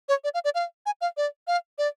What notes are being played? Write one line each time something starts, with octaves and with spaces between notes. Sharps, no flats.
C#5
D5
F5
D5
F5
G#5
F5
D5
F5
D5